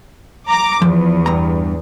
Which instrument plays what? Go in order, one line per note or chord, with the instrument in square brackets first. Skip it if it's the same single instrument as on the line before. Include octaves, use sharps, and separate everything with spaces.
[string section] A#5 D6
[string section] E2 [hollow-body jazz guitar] F3
[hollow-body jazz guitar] G2 A#5